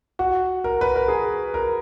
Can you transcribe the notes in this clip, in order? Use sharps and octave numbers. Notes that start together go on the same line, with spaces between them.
F#4
A#4
B4
A#4
G#4
A#4